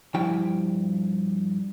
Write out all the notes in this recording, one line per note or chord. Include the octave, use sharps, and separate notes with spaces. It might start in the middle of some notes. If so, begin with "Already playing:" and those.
G2 F3 E4 G5